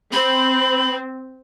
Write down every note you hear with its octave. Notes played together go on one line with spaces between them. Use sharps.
C4 B5